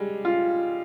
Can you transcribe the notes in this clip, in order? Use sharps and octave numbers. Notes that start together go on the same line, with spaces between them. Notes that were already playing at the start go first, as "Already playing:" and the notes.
Already playing: G3 G#3
F4